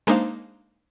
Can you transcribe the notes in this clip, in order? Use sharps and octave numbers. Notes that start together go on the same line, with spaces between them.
G#3 A#3 D4 D#4 C5 F5